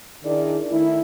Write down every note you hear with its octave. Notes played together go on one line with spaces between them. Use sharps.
D#3 D4 E4 G#4 D5
D#3 A3 E4